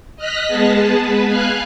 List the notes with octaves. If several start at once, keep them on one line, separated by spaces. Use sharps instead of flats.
D#5 F6 F#6 A#6 B6
G#3 B3 G#4 A5
B3 B4
F5 G#5 F6 F#6